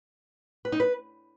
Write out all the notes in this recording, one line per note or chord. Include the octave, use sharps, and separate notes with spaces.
B4
D#4
B4